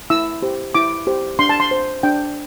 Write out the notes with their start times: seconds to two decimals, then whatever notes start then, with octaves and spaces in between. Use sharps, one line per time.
0.10 E4 E6
0.42 G4 C5
0.75 E4 D6
1.07 G4 C5
1.39 D4 C6
1.49 A5
1.60 C6
1.71 C5
2.03 D4 G5